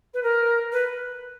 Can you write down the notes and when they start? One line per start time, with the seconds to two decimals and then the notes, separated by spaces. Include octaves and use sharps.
0.14 B4
0.23 A#4
0.72 B4